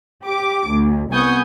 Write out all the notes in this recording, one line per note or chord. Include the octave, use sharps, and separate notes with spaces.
G4 D6
D2
C2 B3 G#5 C#6 D#6 G6